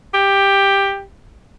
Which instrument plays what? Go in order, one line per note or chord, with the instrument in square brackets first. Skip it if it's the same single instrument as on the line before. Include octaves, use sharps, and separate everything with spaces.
[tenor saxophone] G4